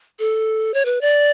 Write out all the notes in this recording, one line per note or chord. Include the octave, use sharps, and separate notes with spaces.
A4
C#5
B4
D5